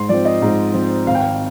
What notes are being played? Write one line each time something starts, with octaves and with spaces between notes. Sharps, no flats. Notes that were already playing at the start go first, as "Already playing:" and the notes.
Already playing: G#2 C6
F3 C4 D5
D#5
G#2
F3 C4
G#1 F5
G5
F5